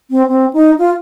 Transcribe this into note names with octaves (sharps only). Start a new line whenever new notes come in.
C4
C4
D#4
F4